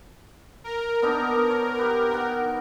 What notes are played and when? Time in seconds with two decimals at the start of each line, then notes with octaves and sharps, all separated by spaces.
0.64 A#4
1.02 B3 D4 D#4
1.50 C#5
1.78 G4 B4
2.13 D#3 F#5